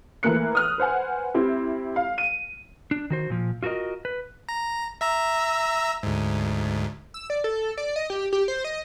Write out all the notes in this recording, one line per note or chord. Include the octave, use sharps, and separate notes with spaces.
E3 A3 A#3 F#6 C#7
D#6 F6 F#6
B4 C5 F#5 G#5
C4 E4 G4
F5
D#7
D4
D#3 F#4 C5
A#2 F3
F4 F#4 A4 A#4 D#5
B4
A#5
E5 A#5 E6
D2 G#2
E6
D5
A4
D5
D#5
G4
G4
C5
D#5